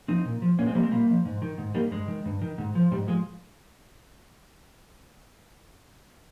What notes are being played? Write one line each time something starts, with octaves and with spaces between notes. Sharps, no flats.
F3 C4 D#4
A#2
F3
A#2 A#3 C#4
G#3 C4
F3 G3 A#3
G#3 C4
A#2 G3 A#3
F3
G#2
D#3
G#2
D#3 G3 A#3
G2 G#3
D#3
G2
D#3
G#2
F3
G#2 G3
F3 G#3